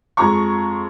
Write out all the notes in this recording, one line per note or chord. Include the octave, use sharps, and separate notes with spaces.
F2 F3 G#3 A#5 C#6